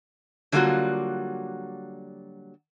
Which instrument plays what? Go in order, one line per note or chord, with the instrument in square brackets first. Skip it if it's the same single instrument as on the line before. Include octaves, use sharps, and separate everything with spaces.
[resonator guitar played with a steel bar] D3 F#3 G3 A#3 F4 F#4